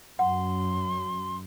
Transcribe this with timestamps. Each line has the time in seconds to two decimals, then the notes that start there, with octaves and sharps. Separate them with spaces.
0.19 F#2 F#5 C6